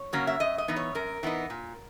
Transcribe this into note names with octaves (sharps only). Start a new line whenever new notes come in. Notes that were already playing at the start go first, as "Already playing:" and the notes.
Already playing: C#5
C#3 F#3 A#3 C#4
E5
F#2 D#5
D#5
E3 B3 D#4
C#5
F#2 A#4
E3 B3 D#4
A#2